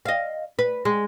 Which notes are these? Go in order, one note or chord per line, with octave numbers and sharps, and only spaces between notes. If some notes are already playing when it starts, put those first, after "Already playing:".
D#5 F5
B4
G#3